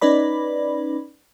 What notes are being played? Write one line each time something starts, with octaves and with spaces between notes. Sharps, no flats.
C#4 D#4 B4 D5 B5